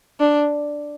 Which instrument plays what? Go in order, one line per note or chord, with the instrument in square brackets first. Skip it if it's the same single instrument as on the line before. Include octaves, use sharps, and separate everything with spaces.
[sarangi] D4